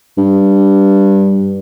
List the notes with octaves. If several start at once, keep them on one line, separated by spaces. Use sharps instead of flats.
G2